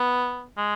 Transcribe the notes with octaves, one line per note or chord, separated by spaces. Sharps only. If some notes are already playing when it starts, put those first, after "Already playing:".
Already playing: B3
G#3